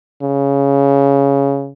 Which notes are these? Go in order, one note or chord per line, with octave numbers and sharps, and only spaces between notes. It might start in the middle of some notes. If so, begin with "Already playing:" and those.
C#3